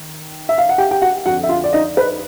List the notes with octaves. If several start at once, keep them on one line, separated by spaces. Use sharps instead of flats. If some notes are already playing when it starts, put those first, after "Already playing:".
Already playing: D#3
E5
F5
F#5
G4 G5
G4 G5
F#4 F#5
F2 D3 F#4 F#5
E5
F4 F5
D5
D#4 D#5
B4